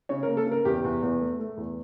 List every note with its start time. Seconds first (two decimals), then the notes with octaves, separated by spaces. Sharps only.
0.09 C#3 C#5
0.23 A#4
0.27 A#3
0.37 A4
0.46 C#3
0.52 A#4
0.65 E2 G4
0.84 E2
1.03 E2
1.21 A3
1.39 A3
1.57 E2